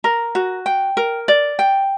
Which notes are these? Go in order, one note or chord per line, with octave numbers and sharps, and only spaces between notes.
A#4
F#4
G5
A#4
D5
G5